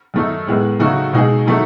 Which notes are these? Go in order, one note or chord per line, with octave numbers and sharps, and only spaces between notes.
F#2 D#3 A3 D#4
A2 G#3 B3
C#3 F#3 A3 D#4 F#4
B2 G#3 D#4 G#4
D#3 F#3 A3 D#4